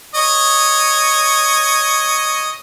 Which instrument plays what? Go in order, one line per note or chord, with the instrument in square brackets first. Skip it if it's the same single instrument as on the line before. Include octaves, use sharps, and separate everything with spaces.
[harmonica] C#5 D#5